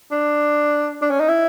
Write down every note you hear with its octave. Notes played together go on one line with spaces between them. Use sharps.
D4
D4
C#4
D#4
E4